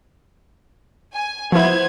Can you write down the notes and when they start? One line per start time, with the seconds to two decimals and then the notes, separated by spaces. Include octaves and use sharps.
1.13 G#5
1.52 F3 B3 E4 C5 G#6